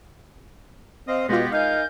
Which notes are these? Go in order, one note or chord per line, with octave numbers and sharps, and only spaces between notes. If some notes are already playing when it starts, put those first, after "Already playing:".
C4 D#5 F5
B2 G#3 A#3 B3 F4 G4 A#6
D#4 A#4 F5 G#5 G6